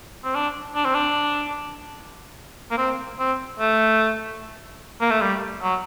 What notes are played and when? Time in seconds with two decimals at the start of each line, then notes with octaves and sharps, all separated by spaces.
0.24 C4
0.35 D4
0.75 D4
0.85 C4
0.95 D4
2.71 A#3
2.78 C4
3.19 C4
3.60 A3
5.01 A#3
5.11 A3
5.21 G3
5.63 F#3